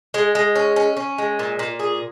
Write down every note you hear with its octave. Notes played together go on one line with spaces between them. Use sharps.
G#3
G#3
C#4
C#4
C#4
G#3
A#2
A#2
G#4